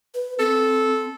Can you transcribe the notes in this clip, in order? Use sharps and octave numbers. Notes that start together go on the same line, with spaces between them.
B4
C4 A4